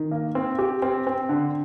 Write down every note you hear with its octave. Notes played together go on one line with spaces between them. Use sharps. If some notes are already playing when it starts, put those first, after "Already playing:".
Already playing: D#3
A#3
C4
G4
C4
C4
D3